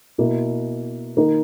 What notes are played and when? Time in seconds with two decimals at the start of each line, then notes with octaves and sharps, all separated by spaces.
0.18 B2 A#3 E4
1.17 D#3 A#3 D#4 A#4